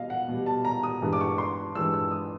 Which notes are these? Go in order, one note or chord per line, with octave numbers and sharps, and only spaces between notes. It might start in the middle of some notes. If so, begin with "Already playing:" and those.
Already playing: B2 G3 D#5 F5
F#5
B2
G3
A5
A#5
D#6
G2 E3 G#3
D6
C#6
C6
G2 E3 G#3 E6
E6
D#6